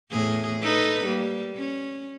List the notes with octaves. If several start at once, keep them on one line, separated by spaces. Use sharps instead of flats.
E2 A2 G#4
D#4 A4 B4
G3 A#3
C#4